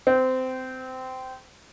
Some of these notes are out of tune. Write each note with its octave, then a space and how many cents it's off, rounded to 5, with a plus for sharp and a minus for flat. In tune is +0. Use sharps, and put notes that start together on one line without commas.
C4 -20